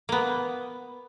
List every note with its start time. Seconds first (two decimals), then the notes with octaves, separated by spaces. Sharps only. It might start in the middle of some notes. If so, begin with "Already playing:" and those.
0.09 A#3 B3